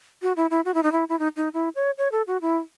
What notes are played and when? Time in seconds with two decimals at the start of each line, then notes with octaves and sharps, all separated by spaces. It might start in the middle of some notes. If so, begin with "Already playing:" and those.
0.22 F#4
0.36 E4
0.50 E4
0.65 F#4
0.74 E4
0.83 D#4
0.92 E4
1.09 E4
1.19 D#4
1.37 D#4
1.54 E4
1.76 C#5
1.98 C#5
2.12 A4
2.27 F#4
2.42 E4